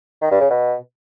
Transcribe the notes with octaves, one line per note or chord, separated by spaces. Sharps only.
D#3
G2
C#3
B2